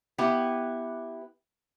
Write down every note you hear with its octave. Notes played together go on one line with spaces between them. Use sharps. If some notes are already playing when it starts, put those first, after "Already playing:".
B3 E4 G4 B4